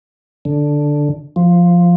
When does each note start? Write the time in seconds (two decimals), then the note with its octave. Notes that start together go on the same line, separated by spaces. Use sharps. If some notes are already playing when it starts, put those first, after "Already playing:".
0.45 D3
1.36 F3